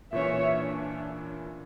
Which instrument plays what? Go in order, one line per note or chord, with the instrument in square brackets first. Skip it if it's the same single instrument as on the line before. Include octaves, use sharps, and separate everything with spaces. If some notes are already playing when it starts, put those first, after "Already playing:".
[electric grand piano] A#2 E3 C#4 [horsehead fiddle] C#5 E5
[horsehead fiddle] D4